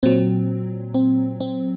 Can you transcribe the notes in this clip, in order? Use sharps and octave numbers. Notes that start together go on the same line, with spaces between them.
A#2 F#3 C4
C4
C4